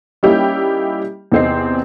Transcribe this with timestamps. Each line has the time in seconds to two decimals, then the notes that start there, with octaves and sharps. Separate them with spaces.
0.23 G3 A#3 C#4 D#4 E4 G4
1.32 E2 C3 C4 D#4 C7